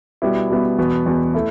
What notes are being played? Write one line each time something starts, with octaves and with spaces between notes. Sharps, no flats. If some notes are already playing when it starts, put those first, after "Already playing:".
B2 G3 B3 E4
B2 G3 B3 E4
E2 B2 B3
E2 B2 B3
A3 E4